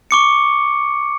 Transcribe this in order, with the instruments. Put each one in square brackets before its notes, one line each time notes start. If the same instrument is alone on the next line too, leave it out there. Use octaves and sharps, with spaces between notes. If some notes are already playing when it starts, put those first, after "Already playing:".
[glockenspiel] C#6 D6 C#7